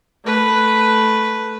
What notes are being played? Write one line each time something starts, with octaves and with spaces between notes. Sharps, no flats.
A3 B4